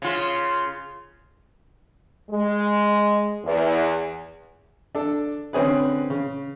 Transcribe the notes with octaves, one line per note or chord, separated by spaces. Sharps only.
C#3 F4
G#3
E2
D4 A4
D3 C4 C#4 G#4 B4
C#3